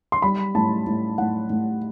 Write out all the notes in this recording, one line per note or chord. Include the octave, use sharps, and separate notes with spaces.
C6
G3 B5
A2 A5
A2
A2 F#5
A2